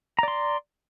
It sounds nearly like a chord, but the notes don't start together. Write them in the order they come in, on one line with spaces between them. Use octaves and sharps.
A#5 D5 C6